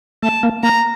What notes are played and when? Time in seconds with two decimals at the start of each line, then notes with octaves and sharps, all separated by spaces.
0.23 A3 A5
0.43 A#3
0.63 A#3 A#5